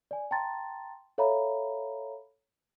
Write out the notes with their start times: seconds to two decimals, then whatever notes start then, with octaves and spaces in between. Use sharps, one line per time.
0.11 D5 G#5
0.31 G5 A5 A#5 C6 A6
1.18 A4 C#5 E5 F5 A#5 B5